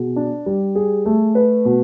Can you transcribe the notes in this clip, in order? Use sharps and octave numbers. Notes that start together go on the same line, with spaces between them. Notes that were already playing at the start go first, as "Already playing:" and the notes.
Already playing: B2 G#4
D4
G3
G#4
A3
B4
B2